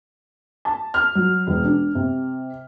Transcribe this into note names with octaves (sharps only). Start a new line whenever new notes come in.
A5
F6
F#3
E1
D4
C3